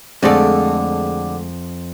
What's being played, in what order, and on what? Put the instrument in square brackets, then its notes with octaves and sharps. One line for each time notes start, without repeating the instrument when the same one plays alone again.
[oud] F2 D5 [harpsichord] D3 [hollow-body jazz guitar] G#3 A3 A4 [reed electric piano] C4 G#4